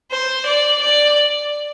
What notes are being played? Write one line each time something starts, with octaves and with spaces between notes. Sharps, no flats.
C5
D5
D5